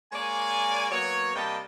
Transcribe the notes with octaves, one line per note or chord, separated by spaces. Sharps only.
G#3 A#3 C#5 D5 G#5
F#3 A#3 B3 C#5
C3 G3 A#3 D#5 G5 A5